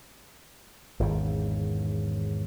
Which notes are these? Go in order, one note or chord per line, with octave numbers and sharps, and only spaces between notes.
G#1 E2 C#3